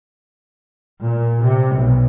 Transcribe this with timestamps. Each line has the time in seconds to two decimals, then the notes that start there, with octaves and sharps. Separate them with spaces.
1.02 A#2
1.42 C3
1.75 B1